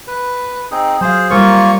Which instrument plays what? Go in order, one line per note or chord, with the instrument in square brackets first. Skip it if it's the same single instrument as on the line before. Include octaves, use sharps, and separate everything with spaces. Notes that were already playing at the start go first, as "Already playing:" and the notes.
[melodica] B4
C4 D#4 G#4
[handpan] F#3 F5 [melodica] G#4 C5
[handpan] G3 A#4 C5 [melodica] A#3 F4 C#6